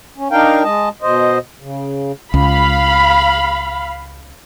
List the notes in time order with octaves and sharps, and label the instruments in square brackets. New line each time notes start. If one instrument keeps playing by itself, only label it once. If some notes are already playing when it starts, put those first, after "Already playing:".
[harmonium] C#4
D4 D#4 A#4 F5 G5
G#3 D#5 A5
B2 C5 D#5
C#3
[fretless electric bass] C#2 [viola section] F5 B5